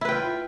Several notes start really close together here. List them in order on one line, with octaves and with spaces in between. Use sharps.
E4 B4 G5 F4